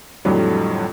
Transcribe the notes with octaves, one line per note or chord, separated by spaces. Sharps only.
F2 A2 D3 F#3 G3